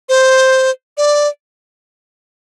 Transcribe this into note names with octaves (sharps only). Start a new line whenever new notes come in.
C5
D5